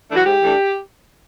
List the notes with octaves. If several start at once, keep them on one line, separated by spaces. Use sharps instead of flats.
E3 A3 D4
F#4
G#2 G4
E3 A3 D4